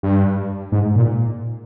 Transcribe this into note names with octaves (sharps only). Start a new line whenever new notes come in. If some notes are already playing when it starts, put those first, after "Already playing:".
G2
G#2
A#2